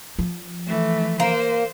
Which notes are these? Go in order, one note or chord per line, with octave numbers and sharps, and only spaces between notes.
F3
E3 A3
A#3 C5